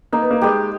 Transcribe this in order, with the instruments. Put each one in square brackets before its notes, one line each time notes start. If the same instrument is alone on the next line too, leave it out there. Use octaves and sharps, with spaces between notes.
[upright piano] A#3 [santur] D#4
[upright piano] B3
A#3
[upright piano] G#3 [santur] G4 B4 D#5